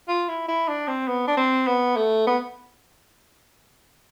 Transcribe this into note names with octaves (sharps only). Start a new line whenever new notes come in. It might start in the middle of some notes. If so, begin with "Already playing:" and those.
F4
E4
E4
D4
C4
B3
D4
C4
B3
A3
B3